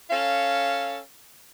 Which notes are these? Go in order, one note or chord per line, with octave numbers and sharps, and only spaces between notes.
C#4 A4 F5